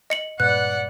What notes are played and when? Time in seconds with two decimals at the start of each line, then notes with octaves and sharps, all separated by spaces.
0.10 D#5 C#7 F#7
0.40 G2 A#2 B4 D5 F#5 F#6